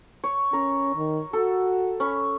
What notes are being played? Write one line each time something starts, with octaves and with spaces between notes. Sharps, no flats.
C#5
C#4 A#4
D#3
F#4 A4
C#4 B5